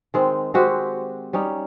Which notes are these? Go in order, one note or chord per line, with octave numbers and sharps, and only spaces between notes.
D#3 G#3 C4
G#3 C4 F#4 G4
G3 C#4 D#4